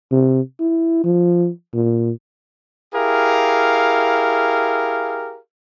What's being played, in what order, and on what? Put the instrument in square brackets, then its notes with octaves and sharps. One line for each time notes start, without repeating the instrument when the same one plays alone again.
[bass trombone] C3
E4
F3
A#2
[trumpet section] E4 G4 G#4 A#4 F5